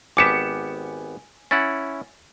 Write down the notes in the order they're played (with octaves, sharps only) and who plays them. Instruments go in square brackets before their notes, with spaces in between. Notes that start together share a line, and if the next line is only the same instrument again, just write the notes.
[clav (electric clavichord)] G#1 B3 G4 [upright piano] G#5 C#7 E7 [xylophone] D6 B6
[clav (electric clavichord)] C#4 E4 F#5 [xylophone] A6